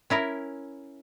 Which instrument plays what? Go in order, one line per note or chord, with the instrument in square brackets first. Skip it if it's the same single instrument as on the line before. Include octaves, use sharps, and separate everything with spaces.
[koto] C#4 E4 A#4